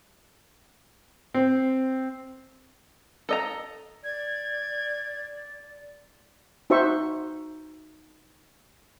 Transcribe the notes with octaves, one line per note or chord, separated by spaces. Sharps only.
C4
A4 D#5 A#5
D5 G#6
D#4 F#4 C5 E5 C#6